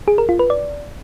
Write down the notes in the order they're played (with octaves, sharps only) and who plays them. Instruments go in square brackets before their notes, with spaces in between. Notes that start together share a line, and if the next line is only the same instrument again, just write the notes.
[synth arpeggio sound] G#4
A#4
F4
B4
D5